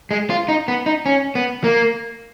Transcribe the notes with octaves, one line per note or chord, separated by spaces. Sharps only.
G#3
F4
D#4
B3
D#4
C#4
B3
A#3